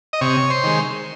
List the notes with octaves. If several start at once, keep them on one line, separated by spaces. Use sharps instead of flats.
D#5
C3 C#5
C5
D#3 G#3